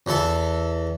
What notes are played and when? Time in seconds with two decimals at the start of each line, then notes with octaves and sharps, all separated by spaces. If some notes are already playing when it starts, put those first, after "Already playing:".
0.06 E2 E3 A4 E5